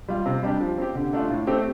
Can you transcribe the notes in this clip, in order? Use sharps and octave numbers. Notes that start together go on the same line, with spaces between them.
G3 F4
C3
G3 D4 G4
F3
C4 G4
D3
A3 D4 F4
A2
A3 C4 G4